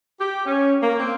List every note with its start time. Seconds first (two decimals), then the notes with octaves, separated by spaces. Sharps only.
0.19 G4
0.46 C#4
0.81 A#3
0.98 C4